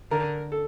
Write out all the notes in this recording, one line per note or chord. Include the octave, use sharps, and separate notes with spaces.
D3 A#4
A4